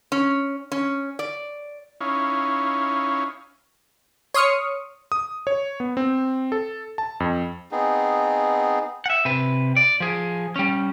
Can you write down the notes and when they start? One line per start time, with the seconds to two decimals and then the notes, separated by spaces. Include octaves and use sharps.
0.12 C#4
0.72 C#4
1.19 D5
2.01 C#4 D#4 E4 C#5 F5
4.34 C#5 C6 D#6 F6 C#7
5.12 D#6
5.47 C#5
5.80 B3
5.97 C4
6.52 A4
6.98 A5
7.20 F2
7.71 B3 C4 D#4 G#4
9.06 E5 F#5
9.25 C3 B4
9.77 D5
10.00 F3 G#4
10.56 G3 C#4